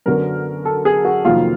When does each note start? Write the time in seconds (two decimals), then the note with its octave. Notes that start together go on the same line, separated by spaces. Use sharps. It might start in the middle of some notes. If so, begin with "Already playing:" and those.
0.06 F#2 D3 F#3 B3 A#4
0.65 A4
0.85 G#4
1.05 F#4
1.25 F2 C3 D#3 F#3 A#3 F4